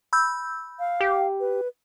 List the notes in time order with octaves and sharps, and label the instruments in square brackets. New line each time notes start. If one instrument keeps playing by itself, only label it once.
[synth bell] B5 E6 G6
[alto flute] F5
[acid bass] G4
[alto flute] B4